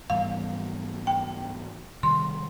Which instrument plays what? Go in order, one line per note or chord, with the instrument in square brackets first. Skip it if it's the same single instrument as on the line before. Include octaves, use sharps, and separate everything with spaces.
[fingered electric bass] G#2 E3 G3 B3 [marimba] F5
[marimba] G5
[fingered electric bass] C3 D#3 G3 [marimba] C6